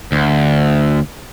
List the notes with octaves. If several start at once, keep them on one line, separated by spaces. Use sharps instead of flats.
D2